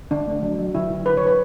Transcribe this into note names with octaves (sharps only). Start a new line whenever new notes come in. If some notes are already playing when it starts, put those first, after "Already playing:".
D3 D4
A3
F#3
F#3
D3 E4
D3
D3 B4
C#5
D3 B4